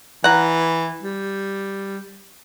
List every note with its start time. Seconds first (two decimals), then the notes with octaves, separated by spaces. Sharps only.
0.24 E3 F#5 A#5
1.03 G3